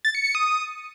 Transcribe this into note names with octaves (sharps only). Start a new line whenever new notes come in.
A6
C#7
C#7
D#6